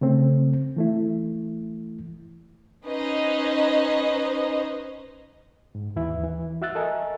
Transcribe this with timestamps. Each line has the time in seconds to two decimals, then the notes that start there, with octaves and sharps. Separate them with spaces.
0.01 C#3 A3 C4
0.76 E3 A3 E4
2.85 C#4 D#4 B4 C5 D#5
5.75 G#2
5.96 D#2 E3 E4 E5
6.23 E3
6.62 F#4 E5 E6 F#6 A6
6.75 A4 A#4 D#5 E5 G#5